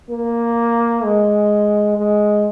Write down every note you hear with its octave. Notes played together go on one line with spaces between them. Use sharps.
A#3
G#3
G#3